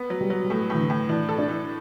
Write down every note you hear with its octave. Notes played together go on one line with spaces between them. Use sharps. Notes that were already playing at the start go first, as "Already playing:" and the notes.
Already playing: B3
F#3
G3
F#3
G3
A2 A3
A2 E3
D3
A2
E3 D4
A4
D4
E3